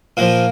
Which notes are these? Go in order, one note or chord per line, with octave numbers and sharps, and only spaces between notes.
A#2 F3 A#3